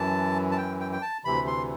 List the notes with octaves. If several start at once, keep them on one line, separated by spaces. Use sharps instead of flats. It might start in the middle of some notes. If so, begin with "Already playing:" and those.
Already playing: F#2 E3 A5
A5
G5
G5
G5
A5
D2 C3 E3 B5
C6